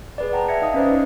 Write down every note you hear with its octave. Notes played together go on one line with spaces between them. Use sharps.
G#4 B4 D5
F#5 G5 A5 A#5
E5 G#6 A#6 C#7
D#4 D#5 F5 D#6
C#4 B4 C5 D5
D#4 B4